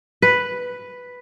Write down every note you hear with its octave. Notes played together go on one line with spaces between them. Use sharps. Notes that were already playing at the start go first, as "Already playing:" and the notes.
B4